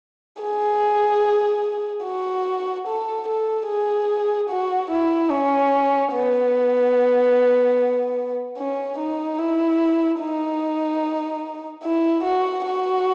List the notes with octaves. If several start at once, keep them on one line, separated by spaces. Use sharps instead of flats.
G#4
F#4
A4
A4
G#4
F#4
E4
C#4
B3
C#4
D#4
E4
D#4
E4
F#4
F#4